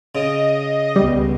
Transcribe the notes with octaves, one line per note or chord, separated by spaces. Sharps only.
C#3 D#5
C#2 G3 B3